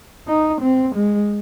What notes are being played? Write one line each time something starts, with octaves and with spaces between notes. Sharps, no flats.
D#4
C4
G#3